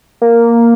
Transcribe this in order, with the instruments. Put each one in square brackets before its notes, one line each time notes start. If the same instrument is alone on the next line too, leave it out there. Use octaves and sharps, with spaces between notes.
[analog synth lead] A#3